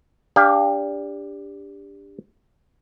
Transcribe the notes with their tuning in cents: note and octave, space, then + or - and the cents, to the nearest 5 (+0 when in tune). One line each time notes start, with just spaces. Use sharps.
D4 -15 G4 +25 F5 +0